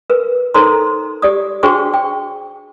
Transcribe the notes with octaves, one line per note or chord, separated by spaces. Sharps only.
A#4 B4
D#4 A4 A#4 C5 A#5 C6
G4 D5 D#6
D4 F#4 G#4 C5 G5 C#6
G5